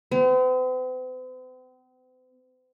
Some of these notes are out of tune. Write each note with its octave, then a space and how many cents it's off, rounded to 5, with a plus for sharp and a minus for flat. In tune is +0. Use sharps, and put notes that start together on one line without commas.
C4 -45